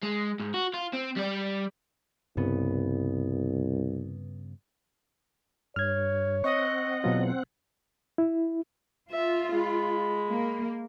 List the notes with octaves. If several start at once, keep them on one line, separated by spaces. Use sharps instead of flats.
G#3
G#2
F#4
F4
C4
G3 D5
C2 G2 C#3 B3
G2 C#5 F6 G#6
C4 D#5 F#5 C#6
E2 B2 F#3 F4
E4
F4 E5
G#3 B5
A#3